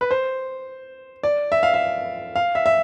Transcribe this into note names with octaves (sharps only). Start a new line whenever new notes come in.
B4
C5
D5
E5
F5
E5
F5
E5
E5